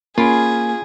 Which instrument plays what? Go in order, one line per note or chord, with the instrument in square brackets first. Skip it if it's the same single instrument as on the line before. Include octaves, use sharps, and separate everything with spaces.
[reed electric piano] A#3 [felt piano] C#4 B5 D7 [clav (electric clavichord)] F4 [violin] G#4